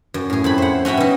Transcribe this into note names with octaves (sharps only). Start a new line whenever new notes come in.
F#2
A2 G#4
F2 E4 B5
C5 F#5
C#4 F#4 E5 G5 B5
B2 D#4